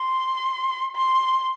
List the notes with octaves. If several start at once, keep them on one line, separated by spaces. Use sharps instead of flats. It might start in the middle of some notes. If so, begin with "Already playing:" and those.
Already playing: C6
C6